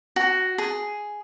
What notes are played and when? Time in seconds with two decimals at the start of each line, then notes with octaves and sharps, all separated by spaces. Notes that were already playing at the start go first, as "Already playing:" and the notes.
0.16 F#4
0.58 G#4